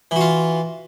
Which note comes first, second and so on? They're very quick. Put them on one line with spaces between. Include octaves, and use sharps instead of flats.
E3 F#4 F4